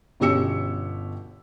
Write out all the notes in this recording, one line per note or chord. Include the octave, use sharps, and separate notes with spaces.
G1 B2 C#4 G4 E6 C#7